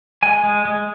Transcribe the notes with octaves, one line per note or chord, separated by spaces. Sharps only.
G#3 G#5
G#3
G#3